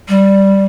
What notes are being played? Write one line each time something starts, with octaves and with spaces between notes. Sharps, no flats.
G3